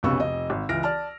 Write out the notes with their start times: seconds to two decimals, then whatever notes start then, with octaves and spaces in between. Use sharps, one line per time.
0.03 F1 B1 C#3 B3 C#6 E6
0.20 F1 D#5
0.50 G#1
0.69 C#2 E3 F6 A#6 D7
0.83 D5 A5 F6